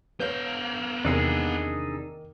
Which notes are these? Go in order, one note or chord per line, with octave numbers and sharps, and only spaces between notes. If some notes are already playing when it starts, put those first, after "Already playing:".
B3 B4 C#5 F5 G6
E2 C3 D#3 A#3 D4 D#4 G#4 E6